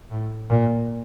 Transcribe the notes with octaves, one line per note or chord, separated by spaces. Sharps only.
A2
A#2